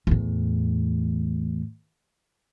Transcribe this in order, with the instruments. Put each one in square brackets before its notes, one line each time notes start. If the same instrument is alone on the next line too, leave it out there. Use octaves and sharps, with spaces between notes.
[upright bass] E2 A2